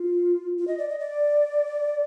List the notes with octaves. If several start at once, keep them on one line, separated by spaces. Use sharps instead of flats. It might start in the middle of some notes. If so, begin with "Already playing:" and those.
Already playing: F4
F4
D#5
D5
D#5
D5